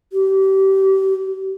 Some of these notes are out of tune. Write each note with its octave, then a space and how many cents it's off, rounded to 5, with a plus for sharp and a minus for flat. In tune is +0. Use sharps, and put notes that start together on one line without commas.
G4 -30